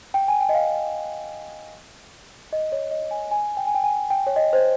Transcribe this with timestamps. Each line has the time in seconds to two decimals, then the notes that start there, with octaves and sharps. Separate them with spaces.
0.14 G5
0.28 G#5
0.41 G5
0.49 D#5
0.55 F5
2.53 D#5
2.72 C#5
2.91 D#5
3.11 G#5
3.31 G#5
3.57 G5
3.67 G#5
3.75 G5
3.84 G#5
4.10 G5
4.27 C#5
4.36 D#5
4.53 C5